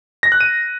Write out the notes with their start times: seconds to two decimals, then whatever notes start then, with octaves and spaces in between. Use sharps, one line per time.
0.23 A#6
0.32 F#6
0.41 D#7